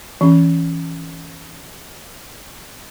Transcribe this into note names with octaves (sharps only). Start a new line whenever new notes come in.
E3 C#4